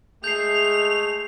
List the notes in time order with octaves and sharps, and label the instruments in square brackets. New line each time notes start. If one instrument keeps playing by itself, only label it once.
[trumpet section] G#3 A3 [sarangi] G#4 [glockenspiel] G6 C7 [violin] F7